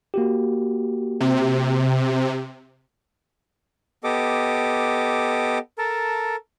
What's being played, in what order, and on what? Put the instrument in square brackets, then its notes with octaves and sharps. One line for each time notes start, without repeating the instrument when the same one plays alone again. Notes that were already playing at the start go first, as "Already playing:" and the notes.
[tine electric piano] A#3 F#4 G4
[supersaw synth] C3
[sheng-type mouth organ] B3 G4 A4 D#5 D6
A4 A#4 A5